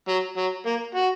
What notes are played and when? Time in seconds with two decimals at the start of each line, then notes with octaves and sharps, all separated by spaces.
0.08 F#3
0.37 F#3
0.66 A#3
0.95 F#4